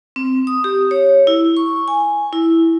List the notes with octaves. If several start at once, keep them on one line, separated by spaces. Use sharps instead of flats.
C4
D#6
G4
C#5
E4
C#6
G#5
E4